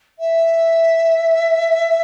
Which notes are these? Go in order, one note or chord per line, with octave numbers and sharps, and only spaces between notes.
E5